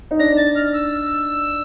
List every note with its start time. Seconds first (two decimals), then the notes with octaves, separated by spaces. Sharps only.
0.11 D#4
0.19 D4 A#6
0.37 A6
0.56 F6
0.73 E6